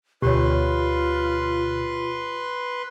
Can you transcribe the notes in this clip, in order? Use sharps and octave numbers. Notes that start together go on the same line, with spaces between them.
D2 B2 F4 G4 B4 C#5 C6